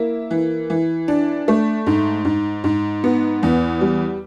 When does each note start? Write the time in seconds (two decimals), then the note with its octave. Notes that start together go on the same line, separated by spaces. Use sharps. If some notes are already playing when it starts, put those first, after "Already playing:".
Already playing: A#3 E4
0.31 E3
0.70 E3
1.08 D4
1.48 A3
1.86 G#2
2.25 G#2
2.64 G#2
3.04 B3
3.43 E2
3.81 G3